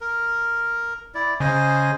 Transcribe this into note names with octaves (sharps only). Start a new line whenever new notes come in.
A#4
E4 D5
C#3 C5 D#5 G#5